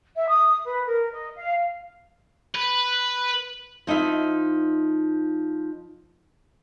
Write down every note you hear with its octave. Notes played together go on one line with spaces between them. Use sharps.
E5
D#6
B4
A#4
D#5
F5
B4
F3 D#4 E4 E5